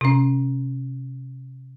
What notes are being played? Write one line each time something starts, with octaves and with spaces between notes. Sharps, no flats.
C3 C#4